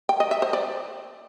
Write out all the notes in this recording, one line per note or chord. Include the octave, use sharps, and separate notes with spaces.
G5
D#5
E5
C5
D5